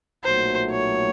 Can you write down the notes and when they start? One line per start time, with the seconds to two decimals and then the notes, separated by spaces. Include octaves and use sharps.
0.24 B1 A#2 F#3 A3 C5
0.71 C#5